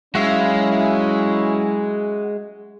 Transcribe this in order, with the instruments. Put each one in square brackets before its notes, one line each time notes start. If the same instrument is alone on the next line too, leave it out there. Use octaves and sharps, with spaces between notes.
[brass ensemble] F#3 C#4 E4 [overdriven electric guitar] G#3 [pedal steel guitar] F#4 E5 F5